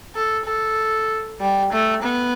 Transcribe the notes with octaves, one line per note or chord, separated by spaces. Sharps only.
A4
A4
G3
A3
B3